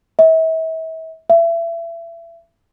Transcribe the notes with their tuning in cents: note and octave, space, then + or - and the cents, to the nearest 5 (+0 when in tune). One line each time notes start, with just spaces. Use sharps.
E5 -40
E5 +30